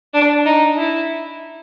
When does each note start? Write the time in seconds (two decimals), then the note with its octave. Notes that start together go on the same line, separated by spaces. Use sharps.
0.14 D4
0.46 D#4
0.78 E4